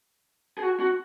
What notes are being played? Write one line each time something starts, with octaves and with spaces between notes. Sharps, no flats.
G#4
F#4
F#4